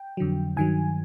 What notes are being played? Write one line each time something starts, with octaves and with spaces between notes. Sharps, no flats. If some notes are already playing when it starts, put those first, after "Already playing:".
Already playing: G5
F2 D3 F#3
G2 D#3 F#3 G#5